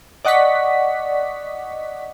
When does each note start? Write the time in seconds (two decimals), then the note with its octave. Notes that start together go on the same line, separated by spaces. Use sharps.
0.25 D5 D#5 F#5 C#6 B6